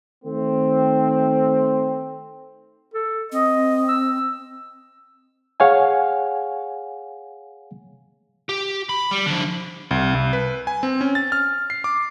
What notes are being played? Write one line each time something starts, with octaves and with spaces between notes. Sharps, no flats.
D#3 A3 C4
A4
C4 D#5
E6
G#4 C#5 F5 F#5 G#5
G4
B5
G3
D3 F3
C2
C2
B4
G#5
C4
C#4
A6
F6
C7
D6